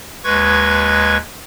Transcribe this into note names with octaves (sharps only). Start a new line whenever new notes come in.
D#2 G#3 B4 C#6 G#6